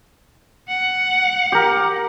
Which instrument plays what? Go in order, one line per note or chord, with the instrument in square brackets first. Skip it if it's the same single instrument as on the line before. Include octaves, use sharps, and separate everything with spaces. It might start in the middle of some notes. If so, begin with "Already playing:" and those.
[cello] F#5
[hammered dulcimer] G4 A#4